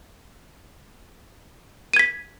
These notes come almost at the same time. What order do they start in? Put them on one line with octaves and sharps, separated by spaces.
D#7 G#6 B6